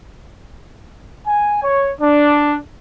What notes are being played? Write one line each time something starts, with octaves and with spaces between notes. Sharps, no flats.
G#5
C#5
D4